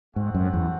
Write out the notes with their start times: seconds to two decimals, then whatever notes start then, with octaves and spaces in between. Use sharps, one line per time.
0.15 G#2 A3 C4 F#4 C5 F#5
0.34 F#2
0.53 E2